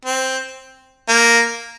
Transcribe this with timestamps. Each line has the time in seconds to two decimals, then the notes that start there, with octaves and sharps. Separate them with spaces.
0.05 C4
1.09 A#3